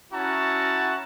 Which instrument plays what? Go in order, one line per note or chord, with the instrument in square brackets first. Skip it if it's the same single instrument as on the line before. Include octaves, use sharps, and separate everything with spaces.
[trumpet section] C#4 E4 F#4 A5 A#5